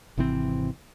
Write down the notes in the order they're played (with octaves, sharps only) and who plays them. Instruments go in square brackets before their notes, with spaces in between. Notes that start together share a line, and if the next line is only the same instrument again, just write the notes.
[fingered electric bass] G#1 C3 E3 C4